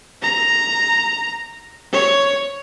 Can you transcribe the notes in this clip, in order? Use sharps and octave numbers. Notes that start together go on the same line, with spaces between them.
A#5
C#5